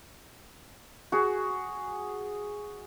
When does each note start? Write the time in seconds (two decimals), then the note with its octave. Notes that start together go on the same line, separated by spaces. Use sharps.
1.12 F#4 G#4